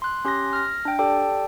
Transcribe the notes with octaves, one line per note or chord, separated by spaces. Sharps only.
C6 F#6
C#4 G4 C6 F#6 A#6
F6 A#6
D4 G5
G4 A4 D5 G5 A5